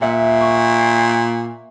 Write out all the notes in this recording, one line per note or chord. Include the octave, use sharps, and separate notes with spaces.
A#2 E5 F#5
C#6